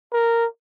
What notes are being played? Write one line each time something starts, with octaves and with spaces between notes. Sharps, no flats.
A#4